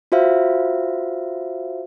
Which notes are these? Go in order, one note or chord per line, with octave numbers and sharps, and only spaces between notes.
F4 F#4 C5 E5 F5